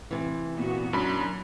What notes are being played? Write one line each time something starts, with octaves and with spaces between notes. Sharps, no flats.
C3 E3
A#2 B3 F#4
F#2 F#3 D4 B5